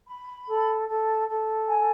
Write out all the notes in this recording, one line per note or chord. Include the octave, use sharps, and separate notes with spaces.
B5
A4
A4
A4
G#5